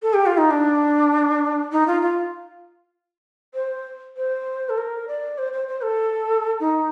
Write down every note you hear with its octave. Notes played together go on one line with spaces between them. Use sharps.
A4
G4
F4
D#4
D4
D#4
F4
F4
C5
C5
A4
A#4
D5
C5
C5
C5
A4
D#4